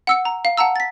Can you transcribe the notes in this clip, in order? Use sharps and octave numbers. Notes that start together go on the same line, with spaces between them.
F#5 E6 C#7
A#5
F5
F#5 A5 A#5 E6
A6 B6